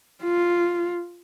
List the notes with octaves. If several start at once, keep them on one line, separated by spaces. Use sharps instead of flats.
F4